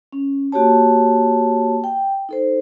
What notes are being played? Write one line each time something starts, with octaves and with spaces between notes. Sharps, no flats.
C#4
A#3 F#4 G4 C#5 A5
G5
D#4 A4 C5